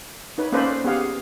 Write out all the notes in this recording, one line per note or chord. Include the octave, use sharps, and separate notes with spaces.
D#4 B4 C#5
A#3 C#4 A4 B4 C5 D5
B3 G4 G#4 F5 F#5